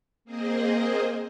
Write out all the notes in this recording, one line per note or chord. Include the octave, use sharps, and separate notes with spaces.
A#3 C4 G#4 C5 D#5